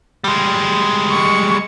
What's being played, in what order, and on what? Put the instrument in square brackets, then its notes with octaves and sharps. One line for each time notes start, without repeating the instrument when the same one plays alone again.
[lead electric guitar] G3 G#3
[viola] C#6